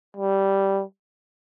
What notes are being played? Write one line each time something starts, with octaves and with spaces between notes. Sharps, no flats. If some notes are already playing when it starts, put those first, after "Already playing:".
G3